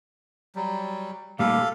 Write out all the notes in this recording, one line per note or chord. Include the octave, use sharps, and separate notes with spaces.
F#3 G3
A#2 G3 A3 A4 F5